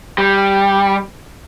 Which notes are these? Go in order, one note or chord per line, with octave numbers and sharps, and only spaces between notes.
G3